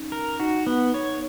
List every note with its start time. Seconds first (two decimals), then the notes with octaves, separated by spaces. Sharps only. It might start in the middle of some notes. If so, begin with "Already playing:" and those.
Already playing: C#4 D#4
0.12 A#4
0.40 D#4 F#4
0.67 B3
0.94 C#5